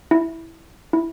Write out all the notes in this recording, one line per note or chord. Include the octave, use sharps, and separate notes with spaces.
E4
E4